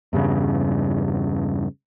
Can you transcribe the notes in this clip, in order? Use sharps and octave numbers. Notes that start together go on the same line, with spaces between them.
E2 G2 C#3